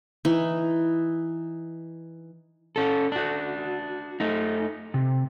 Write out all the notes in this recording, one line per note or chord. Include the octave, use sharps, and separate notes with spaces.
E3 D#4
C#4 A4
D4 F#4
A3 D#4
C3